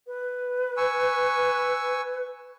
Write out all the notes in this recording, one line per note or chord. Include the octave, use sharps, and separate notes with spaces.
B4
G#5 C#6 E6